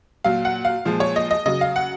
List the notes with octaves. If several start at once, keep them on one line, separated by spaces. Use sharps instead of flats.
A#2 F#3 F5
F#5
F5
A#2 F3 G#3
C#5
D#5
D#5
C#3 F#3 D#5
F5
F#5